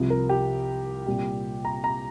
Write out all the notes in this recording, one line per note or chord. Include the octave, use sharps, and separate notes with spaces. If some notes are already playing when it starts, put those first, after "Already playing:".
Already playing: C2 C3 F3
A#4
G4
C2 A#2 G3
A#5
A#5